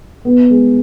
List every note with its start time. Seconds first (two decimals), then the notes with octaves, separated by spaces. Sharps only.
0.25 B3
0.50 G#3